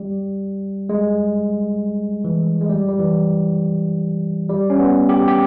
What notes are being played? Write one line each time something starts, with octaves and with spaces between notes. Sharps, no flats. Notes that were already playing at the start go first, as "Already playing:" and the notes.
Already playing: G3
G#3
E3
G#3
G3
G3
E3
G3
C#4
B3
G4
G4